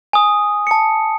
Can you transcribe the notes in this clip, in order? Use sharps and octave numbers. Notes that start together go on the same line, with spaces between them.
G#5 D#6
A5 C#7